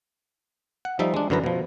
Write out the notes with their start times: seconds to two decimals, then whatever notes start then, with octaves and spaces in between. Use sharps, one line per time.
0.85 F#5
0.99 F3 G3 D#4 E5
1.14 G#3 D4
1.30 F#2 D3 E3 B4 A#5
1.44 B2 F3